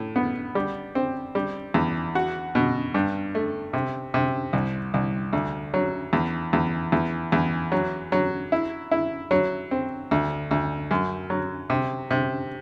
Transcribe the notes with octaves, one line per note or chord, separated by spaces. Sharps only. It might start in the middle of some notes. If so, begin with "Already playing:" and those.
Already playing: A2
B3
G3
C4
G3
E2
F#4
B2
G2
A3
C3
C3
C2
C2
D2
F#3
E2
E2
E2
E2
F#3
F#3
E4
E4
F#3
C4
D2
D2
F#2
F#3
C3
C3